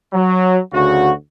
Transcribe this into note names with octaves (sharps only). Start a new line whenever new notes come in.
F#3
D2 C#3 F#4